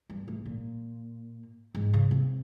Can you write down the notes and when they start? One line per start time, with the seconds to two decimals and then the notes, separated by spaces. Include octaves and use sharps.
0.09 G2
0.28 A2
0.45 A#2
1.75 G#2
1.93 C#3
2.11 C3